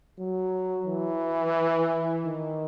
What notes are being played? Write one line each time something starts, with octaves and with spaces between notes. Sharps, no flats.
F#3
E3
D#3